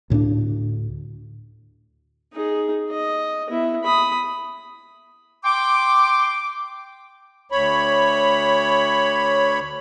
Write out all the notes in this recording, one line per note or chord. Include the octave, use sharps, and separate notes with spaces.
D2 A2 C4 D4
D#4 G#4
D#5
B3 E4
B5 D#6
G5 C6 D6
D2 C#5 B5